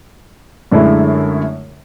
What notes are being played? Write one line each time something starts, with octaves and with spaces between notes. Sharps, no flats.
F#2 D3 G#3 A3 E4